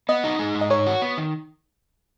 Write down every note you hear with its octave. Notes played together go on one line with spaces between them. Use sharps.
B3 D#5
D#4
G#3
G#2
D#5
D#4 C#5
F#4
B3
D#3